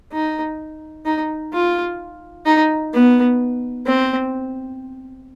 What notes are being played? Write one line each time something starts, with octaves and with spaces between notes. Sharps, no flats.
D#4
D#4
F4
D#4
B3
C4